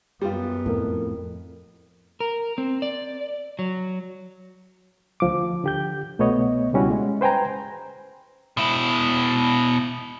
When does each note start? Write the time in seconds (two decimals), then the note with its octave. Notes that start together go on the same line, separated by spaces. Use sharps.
0.22 F#2 G3 B3 F4
0.66 F2 A2 A4 A#4
2.20 A#4
2.58 C4
2.82 D5
3.59 F#3
5.20 D2 F3 D6
5.64 D3 G4 G6
6.19 C2 B2 A3 B3 C#5 D#5
6.73 C#2 B2 G3 C#4 E4 F#4
6.90 G#3
7.21 B4 C5 G5 G#5 A#5
8.57 B2 E4